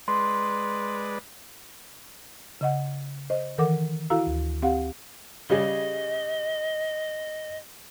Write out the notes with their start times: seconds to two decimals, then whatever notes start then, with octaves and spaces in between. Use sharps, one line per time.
0.08 G#3 B4 D5 C6
2.61 C#3 D#5 F#5
3.30 C5 D#5
3.58 D#3 E3 A4 A#4 F#5 D6
4.10 E4 F#4 A4 F5 A#5 E6
4.27 D2
4.62 C4 G4 F5 F#5
5.50 C#3 G3 G#4 D#5